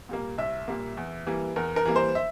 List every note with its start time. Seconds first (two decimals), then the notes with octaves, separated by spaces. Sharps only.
0.09 A#2 G3 A#3
0.38 C2 E5
0.68 A#2 G3 A#3
0.97 E2
1.27 E3 G3 A#3
1.56 E2 A#4
1.76 A#4
1.85 E3 G3 A#3
1.96 C5
2.15 E5